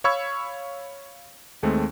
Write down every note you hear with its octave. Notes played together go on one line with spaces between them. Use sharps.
C#5 F5 B5 C#6 E6 G#6
D#2 G#3 A3 C4